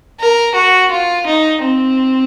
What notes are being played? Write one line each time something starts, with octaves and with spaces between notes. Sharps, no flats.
A#4
F#4
F4
D#4
C4